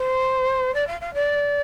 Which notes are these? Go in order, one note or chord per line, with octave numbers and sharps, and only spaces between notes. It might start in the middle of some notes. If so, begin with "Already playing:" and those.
Already playing: C5
D5
F5
F5
D5